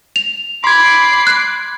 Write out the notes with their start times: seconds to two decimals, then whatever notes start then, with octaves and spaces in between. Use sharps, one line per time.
0.16 F7
0.64 B5 C6 D6 G#6 C7
1.27 F#6